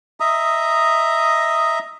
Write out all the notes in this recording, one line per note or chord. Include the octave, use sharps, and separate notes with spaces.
D#5 E5 A#5 D#6